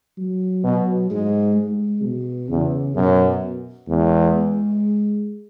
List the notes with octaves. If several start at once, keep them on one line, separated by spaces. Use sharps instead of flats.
F#3
B2
G#2 G#3
G#3
B2
E2 C#3
F#2 B2
E2 G#3